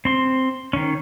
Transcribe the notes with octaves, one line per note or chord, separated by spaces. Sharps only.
C4 C6
D#3 C#4